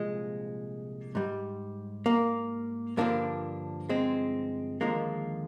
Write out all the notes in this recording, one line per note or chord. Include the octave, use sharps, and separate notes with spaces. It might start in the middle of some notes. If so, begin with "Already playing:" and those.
Already playing: C2 A#2 F3 G#3
G#2 G3
A#3
G2 D3 F3 A#3 D4
G#3 C4
D#2 D3 F3 G#3 A#3